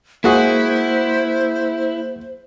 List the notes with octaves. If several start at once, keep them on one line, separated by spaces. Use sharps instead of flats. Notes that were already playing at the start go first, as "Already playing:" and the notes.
G#3 A#3 E4 F#4 G#4 C5